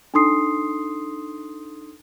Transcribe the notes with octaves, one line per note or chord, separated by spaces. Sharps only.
D4 D#4 A4 C6 D#6 C7